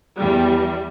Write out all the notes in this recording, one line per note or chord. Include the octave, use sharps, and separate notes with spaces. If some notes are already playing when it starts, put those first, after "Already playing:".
E2 G3